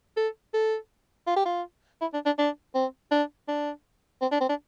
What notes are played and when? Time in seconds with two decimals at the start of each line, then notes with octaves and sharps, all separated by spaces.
0.17 A4
0.54 A4
1.27 F4
1.36 G4
1.46 F4
2.01 E4
2.14 D4
2.26 D4
2.38 D4
2.75 C4
3.11 D4
3.48 D4
4.22 C4
4.32 D4
4.41 C4
4.49 D4